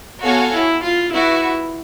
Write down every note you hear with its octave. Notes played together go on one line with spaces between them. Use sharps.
B3 F#4 A4 C#5 F5 G#5
E4
F4
E4 F#4 B4 E5